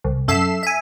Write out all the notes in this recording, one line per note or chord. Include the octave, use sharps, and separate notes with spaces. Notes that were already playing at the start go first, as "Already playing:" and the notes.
C2
F#2 A4 E5 C7 E7
E5 G#5